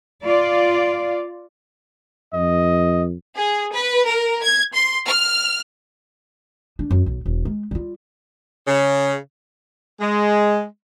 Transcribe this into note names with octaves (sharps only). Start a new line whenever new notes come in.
F4 D5
F2 D#5
G#4
B4
A#4
G#6
C6
F6
D4
F#2
B1
E1
G#3
G3 F4
C#3
G#3